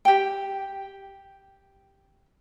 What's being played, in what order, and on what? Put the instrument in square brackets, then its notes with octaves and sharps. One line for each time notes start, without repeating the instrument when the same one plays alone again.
[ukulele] G4 G5